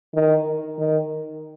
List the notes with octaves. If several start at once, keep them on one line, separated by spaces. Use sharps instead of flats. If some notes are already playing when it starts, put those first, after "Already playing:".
D#3
D#3